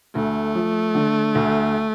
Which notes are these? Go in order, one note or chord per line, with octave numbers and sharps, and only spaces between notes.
D2 A3
F3
D3
D2